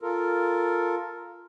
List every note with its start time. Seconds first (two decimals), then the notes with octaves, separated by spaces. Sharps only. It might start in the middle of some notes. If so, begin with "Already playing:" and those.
0.02 F4 A4 A#4